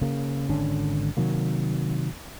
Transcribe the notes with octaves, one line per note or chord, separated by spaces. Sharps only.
C#3 A#3
G#1 D3 C#4 D4
C3 D#3 F#3 A#3